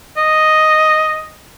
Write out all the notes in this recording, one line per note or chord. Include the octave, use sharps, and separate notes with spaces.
D#5